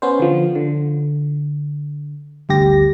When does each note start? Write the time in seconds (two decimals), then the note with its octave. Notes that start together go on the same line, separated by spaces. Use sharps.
0.02 B3 C#4 C5
0.20 D3 F3
0.55 D3
2.49 G1 D2 G2 G4 A#6